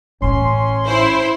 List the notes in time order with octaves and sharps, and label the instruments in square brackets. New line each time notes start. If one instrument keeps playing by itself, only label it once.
[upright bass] A1 A2 [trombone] C#4 [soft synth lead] C6
[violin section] E4 C5